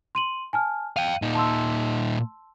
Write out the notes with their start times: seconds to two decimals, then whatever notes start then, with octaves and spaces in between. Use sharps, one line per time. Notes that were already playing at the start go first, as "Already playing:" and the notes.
0.15 C6 D#7 F#7
0.53 G#5 A5 F6
0.96 F5 G5 D#7
1.22 A#2 D#4
1.35 A5 C6 E6